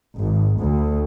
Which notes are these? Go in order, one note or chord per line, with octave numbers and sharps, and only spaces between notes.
G#1
D2